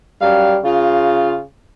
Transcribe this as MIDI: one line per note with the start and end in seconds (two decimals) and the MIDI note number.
0.22 0.55 42
0.22 0.58 55
0.22 0.55 77
0.65 1.43 49
0.65 1.37 65